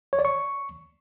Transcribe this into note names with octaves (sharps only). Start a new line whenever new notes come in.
C#5
D5
C#6